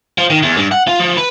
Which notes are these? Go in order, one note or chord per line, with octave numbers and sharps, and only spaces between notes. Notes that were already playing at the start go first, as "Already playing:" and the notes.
F3
D#3
E2
G2
F#5
F4
F3
B4